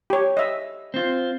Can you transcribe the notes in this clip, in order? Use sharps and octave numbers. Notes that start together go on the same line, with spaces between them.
G4 C#5
D#5 E5
C4 F4